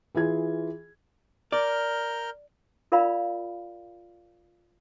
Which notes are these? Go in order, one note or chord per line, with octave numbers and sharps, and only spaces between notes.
E3 F4 G#4 G#6
A#4 D5 F6 G6
F4 A#4 D5 F5 B5